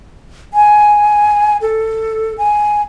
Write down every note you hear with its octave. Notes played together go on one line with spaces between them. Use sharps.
G#5
A4
G#5